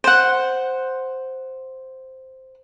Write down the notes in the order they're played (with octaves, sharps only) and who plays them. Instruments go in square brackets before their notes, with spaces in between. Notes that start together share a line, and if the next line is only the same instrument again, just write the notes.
[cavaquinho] C5 F#5